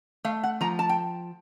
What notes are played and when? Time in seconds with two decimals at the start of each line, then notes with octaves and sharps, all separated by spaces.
0.24 A3 F5
0.43 F#5
0.61 F3 A#5
0.79 A5
0.89 G5